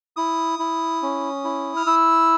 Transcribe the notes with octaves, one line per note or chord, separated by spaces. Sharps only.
E4 D#6
E4
C#4
E4
F6
E4 E6